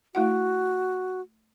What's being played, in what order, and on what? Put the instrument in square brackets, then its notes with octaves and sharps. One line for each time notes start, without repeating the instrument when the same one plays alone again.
[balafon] A3 E4 F#5 [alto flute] F#4